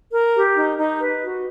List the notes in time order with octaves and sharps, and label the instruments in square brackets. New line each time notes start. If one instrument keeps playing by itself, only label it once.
[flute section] A#4
G4
D#4
D#4
B4
F#4